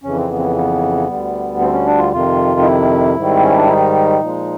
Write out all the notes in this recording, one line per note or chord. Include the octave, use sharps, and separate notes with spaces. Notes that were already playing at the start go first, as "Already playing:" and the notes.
F2 C#3 E3 C#4
C4
B3
C4
B3
B3
D2 D3 G3
C4
C#4
D4
F4
F2 C3 D#3 F4
D#4
E4
G#2 D#3 G3
C4
C#4
D4
D#4
A#2 F3 G#3